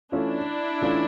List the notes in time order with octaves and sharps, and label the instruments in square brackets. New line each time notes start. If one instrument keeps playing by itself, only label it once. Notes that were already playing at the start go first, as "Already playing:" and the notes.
[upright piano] E3 A3 C#4 F4 [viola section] D4 E4
[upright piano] E3 A3 C#4 F4